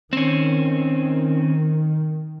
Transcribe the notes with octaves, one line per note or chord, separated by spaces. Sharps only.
D#3 C4 C#4